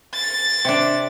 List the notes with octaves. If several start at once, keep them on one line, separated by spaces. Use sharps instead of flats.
A6
C3 D4